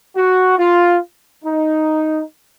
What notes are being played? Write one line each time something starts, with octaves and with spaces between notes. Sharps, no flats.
F#4
F4
D#4